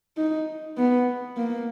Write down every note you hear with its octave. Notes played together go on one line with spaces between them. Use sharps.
D#4
B3
A#3